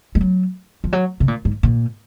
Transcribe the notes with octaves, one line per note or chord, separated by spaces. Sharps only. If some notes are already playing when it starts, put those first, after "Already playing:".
G#3
F#3
F3
F#3
C3
A#2
G#2
A#2